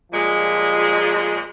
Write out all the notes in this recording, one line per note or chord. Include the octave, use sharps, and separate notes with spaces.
A#2 F3 G3 G#3